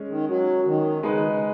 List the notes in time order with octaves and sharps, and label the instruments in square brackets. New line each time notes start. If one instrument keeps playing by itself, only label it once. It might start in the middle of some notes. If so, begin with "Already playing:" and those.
Already playing: [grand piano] G#3 C#4
[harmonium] D#3
F#3
D#3
[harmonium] C#3 [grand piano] G#3 D#4 B4
[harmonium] D#3
C#3